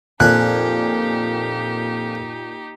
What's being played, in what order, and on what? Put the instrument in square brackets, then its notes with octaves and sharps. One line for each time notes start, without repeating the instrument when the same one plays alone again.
[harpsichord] F2 D4 G#5 [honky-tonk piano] A#2 [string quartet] D#4 G4 [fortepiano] F#6